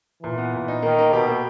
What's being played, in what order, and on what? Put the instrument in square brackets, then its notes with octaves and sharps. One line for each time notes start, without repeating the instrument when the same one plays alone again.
[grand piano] A#2 [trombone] E3
[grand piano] B3
A#2
D#4
[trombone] D#3 [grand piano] A#3
[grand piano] A#3
[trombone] B2 [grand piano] G4
[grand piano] A#3